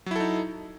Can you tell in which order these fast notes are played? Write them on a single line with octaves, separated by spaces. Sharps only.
F#3 E4 A4 D#4